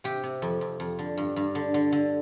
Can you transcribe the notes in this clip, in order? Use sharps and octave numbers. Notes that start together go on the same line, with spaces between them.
C3 G4
C3
F2
F2
F2
D3
G2
G2
D3
D3
D3